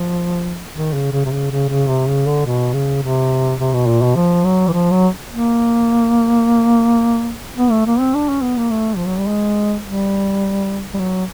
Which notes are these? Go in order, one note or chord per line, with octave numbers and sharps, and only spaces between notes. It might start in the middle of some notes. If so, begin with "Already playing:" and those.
Already playing: F3
D#3
C#3
C#3
C3
C#3
C#3
C#3
C3
C#3
D3
B2
C#3
C3
C3
B2
A#2
B2
F3
F#3
E3
F3
F#3
A#3
B3
A3
A#3
C4
D4
C#4
B3
A#3
A3
F3
F#3
G3
G#3
G3
G3
F#3